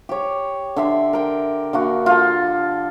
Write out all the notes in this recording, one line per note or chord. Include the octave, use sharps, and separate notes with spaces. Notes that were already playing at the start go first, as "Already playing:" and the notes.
G4 C#5
D3 E5 C6
A#4 G5
D3 A#3 F#4
F4 A4